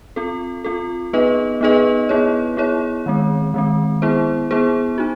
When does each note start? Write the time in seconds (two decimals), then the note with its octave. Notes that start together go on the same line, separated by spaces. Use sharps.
0.16 C4 F4 A4
0.64 C4 F4 A4
1.13 B3 D#4 G#4 B4 D#5
1.61 B3 D#4 G#4 B4 D#5
2.09 B3 E4 G#4 C#5
2.57 B3 E4 G#4 C#5
3.06 D#3 G#3 C4
3.54 D#3 G#3 C4
4.02 B3 E4 G#4 C5
4.51 B3 E4 G#4 C5
4.98 D#4 F#4